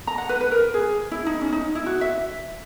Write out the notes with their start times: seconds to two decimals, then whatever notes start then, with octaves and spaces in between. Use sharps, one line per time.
0.07 A#5
0.18 F#5
0.29 B4
0.41 B4
0.52 A#4
0.74 G#4
1.11 E4
1.26 D#4
1.41 C#4
1.53 D#4
1.75 E4
1.86 F#4
2.01 E5